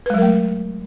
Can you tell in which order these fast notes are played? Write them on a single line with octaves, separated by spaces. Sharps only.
B4 G#3 F#3 A#4 A3